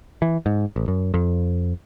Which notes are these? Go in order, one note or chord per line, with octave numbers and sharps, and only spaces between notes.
E3
G#2
A1
F#2
F2